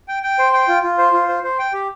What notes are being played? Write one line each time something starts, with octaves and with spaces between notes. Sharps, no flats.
G5
G5
C5
G5
F4
F4
C5
F4
C5
C5
G5
G4